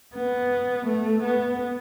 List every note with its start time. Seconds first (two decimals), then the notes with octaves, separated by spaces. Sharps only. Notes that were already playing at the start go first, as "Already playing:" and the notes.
0.15 B3
0.87 A3
1.24 B3